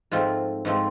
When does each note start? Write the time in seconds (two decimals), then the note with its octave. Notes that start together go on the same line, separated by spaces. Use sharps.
0.11 G#2 F3 A3 C4 F4
0.65 G#2 F3 A3 C4